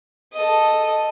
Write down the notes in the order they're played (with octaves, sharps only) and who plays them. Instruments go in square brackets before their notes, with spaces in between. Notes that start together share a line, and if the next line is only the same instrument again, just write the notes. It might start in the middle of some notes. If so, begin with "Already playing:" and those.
[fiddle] A4 D#5